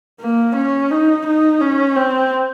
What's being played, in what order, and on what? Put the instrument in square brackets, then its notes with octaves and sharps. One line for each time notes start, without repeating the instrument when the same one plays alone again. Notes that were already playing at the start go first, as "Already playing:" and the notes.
[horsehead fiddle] A#3
C#4
D#4
D#4
C#4
C4